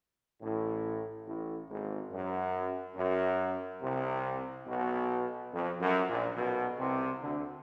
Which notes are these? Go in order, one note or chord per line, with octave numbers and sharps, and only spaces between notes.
A1 A2
A1 A2
G#1 G#2
F#2
F#2
C2 C3
B1 B2
F2
F#2
A#1 A#2
B1 B2
C2 C3
D2 D3